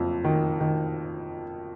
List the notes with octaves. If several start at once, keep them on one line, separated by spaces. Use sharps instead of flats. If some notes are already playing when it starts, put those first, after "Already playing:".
Already playing: F#1 F2
D#3
D#3